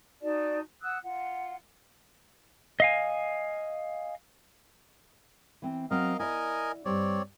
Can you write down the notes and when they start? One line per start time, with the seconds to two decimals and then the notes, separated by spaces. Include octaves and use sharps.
0.20 D#4 F#4 D5 A5
0.82 F#5 D#6 E6 F#6
1.02 F4 F#5
2.80 D#5 F5 G#5
5.62 E3 C4
5.91 F#3 C4 A#4 D#5 F5
6.20 E4 A#4 D5 D#5 G#5
6.85 G2 G3 C4 C#5 D5